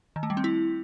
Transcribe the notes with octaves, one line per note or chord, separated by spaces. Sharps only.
D#3
A3
G3
C4
E4